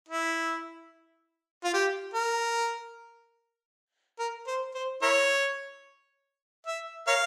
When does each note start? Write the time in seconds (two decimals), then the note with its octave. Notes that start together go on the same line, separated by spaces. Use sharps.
0.09 E4
1.64 F4
1.73 G4
2.14 A#4
4.19 A#4
4.47 C5
4.75 C5
5.02 E4 A#4 C#5
6.67 E5
7.07 A#4 C#5 F5